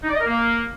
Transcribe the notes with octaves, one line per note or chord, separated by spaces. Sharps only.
D#4
D5
D#5
A#4
A#3